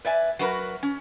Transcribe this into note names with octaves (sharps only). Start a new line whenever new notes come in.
B4 D5 E5 G#5
F#3 F#4 A#4 B4
C#4